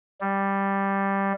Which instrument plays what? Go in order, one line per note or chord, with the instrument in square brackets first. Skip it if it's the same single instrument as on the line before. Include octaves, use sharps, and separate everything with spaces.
[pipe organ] G3